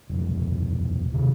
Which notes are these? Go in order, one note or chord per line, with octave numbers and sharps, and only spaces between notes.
D#1 F2
C3 D#3